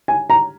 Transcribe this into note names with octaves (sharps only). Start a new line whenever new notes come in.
G#5
A#5